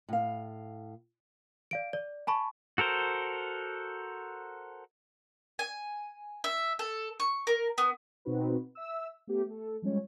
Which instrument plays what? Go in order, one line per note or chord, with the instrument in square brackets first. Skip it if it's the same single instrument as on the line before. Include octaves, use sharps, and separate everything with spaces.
[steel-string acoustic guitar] A2 F5
[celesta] D5 F5 D7
D5
G#5 A5 B5 C#6
[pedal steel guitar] F#4 A4 A#4 C5
[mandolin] G#5
E5
A4
C#6
A#4
B3
[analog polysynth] B2 C4 D#4 F#4 B4
E5 E6
A3 B3 G4
A3 A4
F3 G3 G#3 C#4 C#5